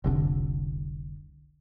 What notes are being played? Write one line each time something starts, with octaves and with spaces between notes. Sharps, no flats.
F1 C2 D3